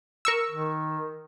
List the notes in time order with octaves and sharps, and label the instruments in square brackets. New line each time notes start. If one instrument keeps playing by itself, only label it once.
[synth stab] A#4 C#6 E6
[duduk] D#3